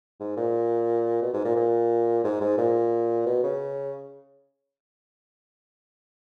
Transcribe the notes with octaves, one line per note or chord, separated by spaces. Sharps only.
G#2
A#2
B2
G#2
A#2
A#2
G#2
G#2
A#2
B2
C#3